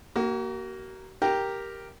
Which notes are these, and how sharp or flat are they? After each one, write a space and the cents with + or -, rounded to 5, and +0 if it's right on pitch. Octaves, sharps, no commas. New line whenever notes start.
A#3 +0 F#4 +45
G4 +0 A#4 +0 G5 +0